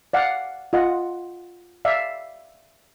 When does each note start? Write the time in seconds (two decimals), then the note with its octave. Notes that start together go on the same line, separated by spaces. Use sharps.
0.13 D5 F5 F#5
0.73 F4 D#5 F#5
1.85 D5 E5 F5